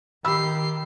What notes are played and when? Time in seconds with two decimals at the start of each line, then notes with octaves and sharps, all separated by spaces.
0.25 D#3 G4 B5 E6 C7